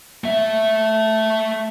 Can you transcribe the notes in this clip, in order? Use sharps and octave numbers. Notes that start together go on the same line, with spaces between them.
A3 E5